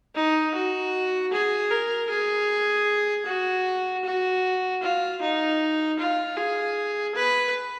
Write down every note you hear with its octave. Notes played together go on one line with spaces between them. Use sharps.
D#4
F#4
G#4
A#4
G#4
F#4
F#4
F4
D#4
F4
G#4
B4